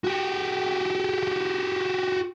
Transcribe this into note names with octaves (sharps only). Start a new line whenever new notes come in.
F#4 G4